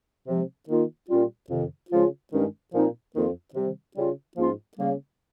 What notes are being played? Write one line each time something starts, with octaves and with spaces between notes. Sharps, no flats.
C3 F3 G#3
D#3 A#3 F4
A#2 G3 C#4 F4
F2 C3 D#3
C#3 F3 G#3 C#4 F4
G2 D#3 G#3 C#4
A#2 F3 C4 D#4
F2 D#3 A#3 F4
C3 D#3 G3
C#3 G3 C#4 F4
G#2 F3 A#3 C#4 F4
C#3 G3 A#3